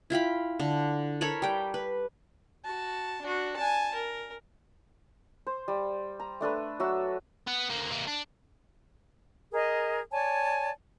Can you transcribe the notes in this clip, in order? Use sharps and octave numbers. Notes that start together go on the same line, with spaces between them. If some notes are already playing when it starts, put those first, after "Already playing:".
E4 F4 G5 B5
D3
A4 A#4 C#5 B5
G3 G5
B4
F#4 A5
D4 F#4
G#5 A5
A#4
C5
G3
A#5
A3 D4 A4 B4
F#3 F#4 E5 E6
B3
D2 A#3
C3 A#3
D4
G#4 A#4 D#5
C#5 D5 G#5 A5